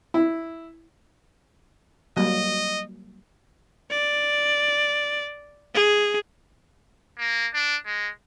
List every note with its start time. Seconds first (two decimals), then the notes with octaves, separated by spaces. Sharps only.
0.14 E4
2.17 F#3 G3 A#3 D#5
3.91 D5
5.75 G#4
7.18 A#3
7.54 D4
7.86 G#3